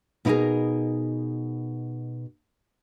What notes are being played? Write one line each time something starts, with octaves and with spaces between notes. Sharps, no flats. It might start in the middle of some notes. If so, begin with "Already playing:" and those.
B2 D#4 E4 G4 G#4 A#4